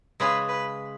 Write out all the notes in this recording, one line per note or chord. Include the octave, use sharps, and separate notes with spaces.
C#3 G#3 C#4 G#4 B4
B4